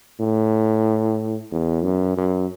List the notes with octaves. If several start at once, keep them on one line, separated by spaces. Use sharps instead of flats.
A2
E2
F#2
F#2